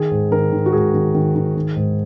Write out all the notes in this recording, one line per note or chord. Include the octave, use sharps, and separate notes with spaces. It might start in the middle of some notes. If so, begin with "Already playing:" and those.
Already playing: D#3 G#4
G#2
D#3 A#4
D#3
F#4
G#2 G#4
D#3
D#3
D#3
D#3
G#2